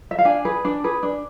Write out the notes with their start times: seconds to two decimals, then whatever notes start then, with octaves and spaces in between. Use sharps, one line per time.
0.11 E5
0.18 F5
0.25 D4 G#5
0.45 G#4 B4
0.65 D4
0.84 G#4 B4
1.03 D4